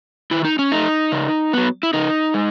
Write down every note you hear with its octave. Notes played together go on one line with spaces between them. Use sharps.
D#3 E4
D#4
C#4
A3 D#4
C#3
F#3 B3
E4
C#3 D#4
G#3